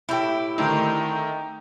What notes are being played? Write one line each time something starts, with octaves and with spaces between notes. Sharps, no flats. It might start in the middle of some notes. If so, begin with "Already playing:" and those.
A2 E4 G4 G5
D3 D#3 A3 C4 D#4 G5 A#5